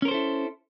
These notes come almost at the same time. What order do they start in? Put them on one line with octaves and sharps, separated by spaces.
C#4 A#4 C5 A4 E4